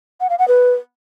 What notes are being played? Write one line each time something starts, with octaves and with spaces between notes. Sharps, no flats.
F#5
F5
F#5
B4